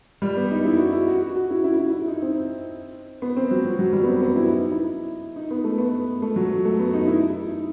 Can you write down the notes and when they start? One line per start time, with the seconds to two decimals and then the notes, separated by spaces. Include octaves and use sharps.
0.22 G3
0.37 B3
0.51 D#4
0.65 E4
0.78 F#4
0.93 E4
1.08 F#4
1.22 F#4
1.36 F#4
1.50 E4
1.64 E4
1.79 E4
1.93 E4
2.07 D#4
2.22 C4
3.22 B3
3.37 C4
3.51 F#3
3.65 F#3
3.79 F#3
3.93 G3
4.03 B3
4.08 C4
4.22 B3
4.36 E4
4.50 D#4
4.71 E4
5.36 D#4
5.51 B3
5.64 A3
5.78 B3
6.22 A3
6.36 F#3
6.65 A3
6.79 B3
6.94 D#4
7.07 E4
7.29 E4
7.50 D#4